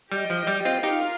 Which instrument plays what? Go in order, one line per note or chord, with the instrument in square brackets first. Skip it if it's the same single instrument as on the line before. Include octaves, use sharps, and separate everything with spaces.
[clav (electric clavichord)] G3 [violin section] G4 D#5 G5
[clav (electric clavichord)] F3
G3
C4 F4
[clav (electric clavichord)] D#4 G4 [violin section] F4 A#4 F5